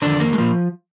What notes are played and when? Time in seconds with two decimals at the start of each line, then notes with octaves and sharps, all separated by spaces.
0.02 F2 D3 D#3 D4
0.20 A#3
0.33 G#3
0.38 A#2 F3 A#3